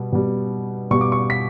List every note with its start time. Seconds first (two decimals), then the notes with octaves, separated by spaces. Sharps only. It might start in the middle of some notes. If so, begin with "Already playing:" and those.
Already playing: B2 G3
0.13 B2 G3
0.91 B2 G3 C#6
1.01 D6
1.12 C#6
1.30 B6